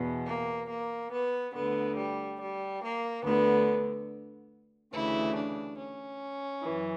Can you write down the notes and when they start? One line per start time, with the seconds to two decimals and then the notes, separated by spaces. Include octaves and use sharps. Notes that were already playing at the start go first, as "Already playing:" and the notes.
Already playing: E2 B2
0.26 A#3
0.69 A#3
1.11 B3
1.53 D2 D3 B3
1.96 G3
2.39 G3
2.82 A#3
3.24 D2 D3 B3
4.94 D2 C#3 E3 E4
5.36 D4
5.79 C#4
6.64 F#2 E3